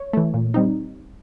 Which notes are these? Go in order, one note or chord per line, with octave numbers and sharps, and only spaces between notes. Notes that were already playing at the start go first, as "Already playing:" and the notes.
Already playing: C#5
E3 A3
A#2
G3 C4 D#4